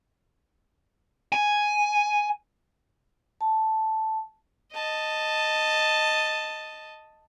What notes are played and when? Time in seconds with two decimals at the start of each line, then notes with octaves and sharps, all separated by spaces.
1.32 G#5
3.41 A5
4.73 D#5 A5